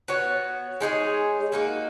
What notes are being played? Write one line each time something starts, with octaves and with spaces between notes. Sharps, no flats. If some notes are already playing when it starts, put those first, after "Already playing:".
B3 F#4 C#5
G#3 D#4 G#4 C#5
A#3 D#4 F#4